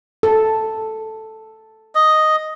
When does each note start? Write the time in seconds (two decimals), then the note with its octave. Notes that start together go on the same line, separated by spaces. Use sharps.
0.23 A4
1.95 D#5